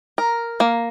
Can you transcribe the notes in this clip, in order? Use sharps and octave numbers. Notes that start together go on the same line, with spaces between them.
A#4
A#3